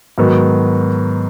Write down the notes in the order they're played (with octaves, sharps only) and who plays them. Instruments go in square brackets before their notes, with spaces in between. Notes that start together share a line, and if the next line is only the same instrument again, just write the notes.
[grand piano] G#2 D#3 F#3 B3